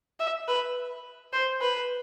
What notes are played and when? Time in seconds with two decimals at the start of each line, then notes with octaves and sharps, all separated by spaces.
0.20 E5
0.48 B4
1.33 C5
1.61 B4